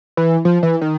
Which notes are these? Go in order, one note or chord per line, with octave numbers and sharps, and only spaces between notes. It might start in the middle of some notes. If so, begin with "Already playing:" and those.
E3
F3
E3
D#3